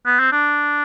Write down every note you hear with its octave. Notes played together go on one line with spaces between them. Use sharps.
B3
C4
D4